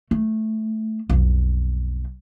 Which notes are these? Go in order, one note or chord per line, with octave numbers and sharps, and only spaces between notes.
A3
B1 F2